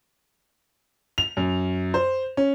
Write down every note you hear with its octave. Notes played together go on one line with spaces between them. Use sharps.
F7
F#2
C5
C#4